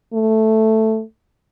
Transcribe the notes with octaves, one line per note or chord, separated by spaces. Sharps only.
A3